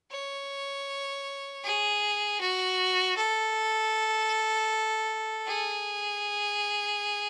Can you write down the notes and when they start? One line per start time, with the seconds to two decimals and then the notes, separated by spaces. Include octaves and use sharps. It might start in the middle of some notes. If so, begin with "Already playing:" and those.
0.11 C#5
1.64 G#4
2.41 F#4
3.17 A4
5.47 G#4